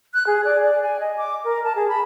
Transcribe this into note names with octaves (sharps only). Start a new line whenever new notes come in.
F#6
G#4
D5
D5
G#5
D#5
D6
A#4
A5
G#4
B5